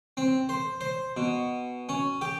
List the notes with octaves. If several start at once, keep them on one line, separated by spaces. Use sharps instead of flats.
C4
C5
C5
B2
C#4
G4